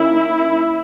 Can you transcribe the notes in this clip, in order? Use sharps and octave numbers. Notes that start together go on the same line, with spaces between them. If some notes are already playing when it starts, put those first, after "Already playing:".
Already playing: D#3 A#3 C#4 E4